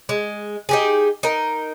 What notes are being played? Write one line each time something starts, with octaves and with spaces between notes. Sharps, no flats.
G#3
D#4 G4 G#4
D#4 A#4